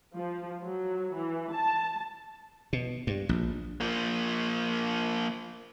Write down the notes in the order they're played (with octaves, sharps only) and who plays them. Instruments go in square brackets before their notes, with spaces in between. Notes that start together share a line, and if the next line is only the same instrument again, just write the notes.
[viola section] F3
F#3
E3
A5
[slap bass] B2
G2
A#1
[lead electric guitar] F3 A#3